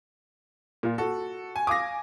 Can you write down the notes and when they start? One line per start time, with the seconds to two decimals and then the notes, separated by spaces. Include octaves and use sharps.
0.83 A#2 F4
0.98 F#4 A4
1.56 G#5
1.67 F5 G#5 D6 D#6 A#6